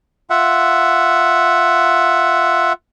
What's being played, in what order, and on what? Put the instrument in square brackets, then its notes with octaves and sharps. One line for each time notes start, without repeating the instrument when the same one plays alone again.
[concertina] F4 E5 F#5